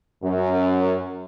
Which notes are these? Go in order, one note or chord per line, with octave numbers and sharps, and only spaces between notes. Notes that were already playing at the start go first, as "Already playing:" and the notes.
F#2